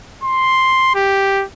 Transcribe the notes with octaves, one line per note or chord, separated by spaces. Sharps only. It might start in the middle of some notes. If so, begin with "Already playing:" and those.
C6
G4